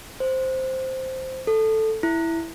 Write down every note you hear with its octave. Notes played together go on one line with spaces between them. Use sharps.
C5
A4
E4